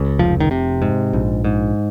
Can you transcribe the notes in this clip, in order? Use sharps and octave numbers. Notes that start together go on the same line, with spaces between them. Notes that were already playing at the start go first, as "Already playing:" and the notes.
Already playing: C#2
F1 F3
D#3
C3
G#2
A#1
G#2